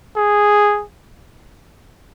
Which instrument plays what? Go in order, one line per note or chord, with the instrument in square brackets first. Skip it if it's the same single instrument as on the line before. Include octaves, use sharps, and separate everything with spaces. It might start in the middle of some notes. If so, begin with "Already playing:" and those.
[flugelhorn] G#4